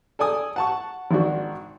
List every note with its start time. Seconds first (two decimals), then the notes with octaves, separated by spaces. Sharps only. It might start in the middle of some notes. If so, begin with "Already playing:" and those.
0.19 A4 D5 G#5 D#6
0.56 F#5 A5 C#6
1.11 G#1 D#3 D4 F#4